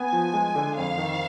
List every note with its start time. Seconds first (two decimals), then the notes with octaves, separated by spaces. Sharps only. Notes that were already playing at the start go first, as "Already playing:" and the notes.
Already playing: B3 G#5
0.12 F3
0.33 G#3
0.55 D3
0.76 F2 F5
0.98 D#3